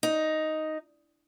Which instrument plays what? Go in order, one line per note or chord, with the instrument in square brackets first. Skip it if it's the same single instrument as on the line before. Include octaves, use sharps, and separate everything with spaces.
[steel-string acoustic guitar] D#4